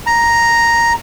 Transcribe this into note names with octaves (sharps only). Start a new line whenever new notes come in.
A#5